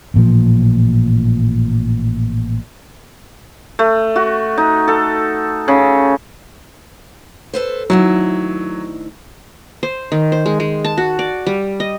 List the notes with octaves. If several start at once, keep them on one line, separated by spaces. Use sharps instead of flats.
A1 A#2 F3
A3
F#4
D#4
A4
C#3
A4 B4 C5
D2 D#3 F#3 E4
C5
D#3
C5
G#3
G#3
A5
F#4
D5
G3
D#5